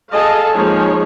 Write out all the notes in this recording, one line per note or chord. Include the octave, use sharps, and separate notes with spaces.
G#4 A4 D#5 F5 A5
F3 G#3 A#3 D#4 G#4 C#5